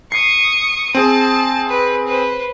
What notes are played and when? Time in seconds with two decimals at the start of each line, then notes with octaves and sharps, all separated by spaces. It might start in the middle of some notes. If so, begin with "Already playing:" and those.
0.12 C#6 D#6 C7
0.95 C4 G#4 A5
1.68 B4
2.07 B4 C5